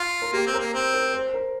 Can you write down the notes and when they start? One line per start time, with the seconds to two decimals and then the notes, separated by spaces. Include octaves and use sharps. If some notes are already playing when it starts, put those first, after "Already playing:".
Already playing: F4
0.22 A#4
0.33 A#3 G4
0.47 C4
0.54 A#4
0.59 A#3
0.74 C4 C5
0.94 A#4
1.14 C5
1.34 A#4